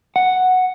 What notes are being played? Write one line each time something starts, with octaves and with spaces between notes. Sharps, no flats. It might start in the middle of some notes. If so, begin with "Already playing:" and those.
F#5